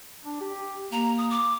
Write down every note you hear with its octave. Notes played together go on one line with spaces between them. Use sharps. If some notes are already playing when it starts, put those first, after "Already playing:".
D4
G4
A#3 A#5
D#6
D6